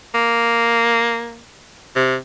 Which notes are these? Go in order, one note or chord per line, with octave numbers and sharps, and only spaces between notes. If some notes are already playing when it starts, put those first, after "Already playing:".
A#3
C3